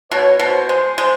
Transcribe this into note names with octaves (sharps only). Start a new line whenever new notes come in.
B2 C#5
B2 C5
G#3
G#3